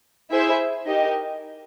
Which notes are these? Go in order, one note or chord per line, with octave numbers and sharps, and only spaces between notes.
E4 G#4 C5 E5
D#4 G4 A#4 D#5